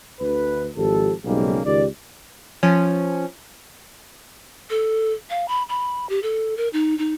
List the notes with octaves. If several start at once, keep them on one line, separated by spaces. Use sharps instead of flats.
D2 B4
G#1 F3 G4 A4
B1 G#2 C#3 G3 G#3 A#3
C#2 D#3 G4 D5
F3 C#4
A4
F5
B5
B5
G4
A4
A#4
D#4
D#4